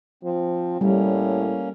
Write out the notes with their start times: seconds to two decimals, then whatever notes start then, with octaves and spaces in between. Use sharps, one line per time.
0.23 F3 C4
0.81 A2 G3 A#3 C#4